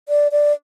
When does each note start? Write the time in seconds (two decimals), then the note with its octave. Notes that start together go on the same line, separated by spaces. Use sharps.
0.09 D5
0.32 D5